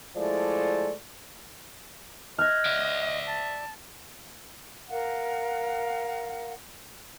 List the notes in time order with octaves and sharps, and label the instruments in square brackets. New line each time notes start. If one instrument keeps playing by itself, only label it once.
[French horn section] F3 G#3 A3 E4 D5
[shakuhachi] D#5 [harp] F6 F#6 G#6
[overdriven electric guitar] D5 E5
[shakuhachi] A5
[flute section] A#4 F5 F#5